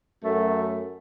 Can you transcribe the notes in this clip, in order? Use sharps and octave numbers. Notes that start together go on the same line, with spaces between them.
F#2 A3